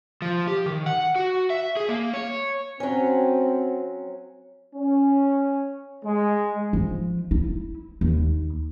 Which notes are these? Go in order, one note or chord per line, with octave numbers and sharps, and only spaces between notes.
F3
G4
D#3
F#5
F#4
E5
G#4
A#3
C#5
F#3 C4 C#4
C#4
G#3
F3
E4
D#2